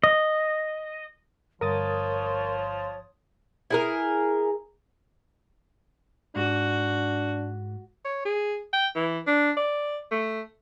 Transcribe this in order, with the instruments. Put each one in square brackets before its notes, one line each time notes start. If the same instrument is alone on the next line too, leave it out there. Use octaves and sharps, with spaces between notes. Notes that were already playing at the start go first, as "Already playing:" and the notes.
[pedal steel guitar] D#5
[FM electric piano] G1 D#6 A6 [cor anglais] F3 [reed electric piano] A#4 [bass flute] C#5
[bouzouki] E4 G#4 A#4
[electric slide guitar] G#2 [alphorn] D4 [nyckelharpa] F#4
[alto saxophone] C#5
G#4
G5
E3
D4
D5
A3